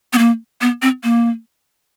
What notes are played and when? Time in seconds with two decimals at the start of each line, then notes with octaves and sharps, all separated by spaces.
0.13 B3
0.18 A#3
0.61 B3
0.82 C4
1.04 A#3